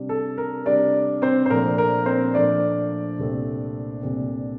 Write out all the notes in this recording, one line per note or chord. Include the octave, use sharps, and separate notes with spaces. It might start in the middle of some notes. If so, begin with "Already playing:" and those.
Already playing: C3 G3 D4
A4
A#4
C3 G3 D4 D5
C4 C5
C5
A#2 F3 A3 D4 A#4
A#4
C4 C5
A#2 F3 A3 D4 D5
C2 A#2 A3 C4
C2 A#2 A3 C4